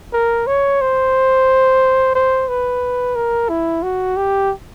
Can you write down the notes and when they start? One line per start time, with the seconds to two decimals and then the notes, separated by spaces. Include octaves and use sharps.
0.13 A#4
0.47 C#5
0.81 C5
2.15 C5
2.48 B4
3.16 A#4
3.49 E4
3.83 F#4
4.17 G4